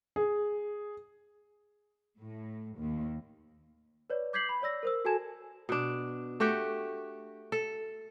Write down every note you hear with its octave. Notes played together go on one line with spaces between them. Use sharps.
G#4
A2
D#2
B4 C#5 D5
D6 G6 G#6 B6 C7 F#7
B5
C#5 D5 E6 A#6
A#4 C5 E6
F#4 A4 G#5 A5 G#6 E7
B2 D4
A3 F#4 G4 G5
A4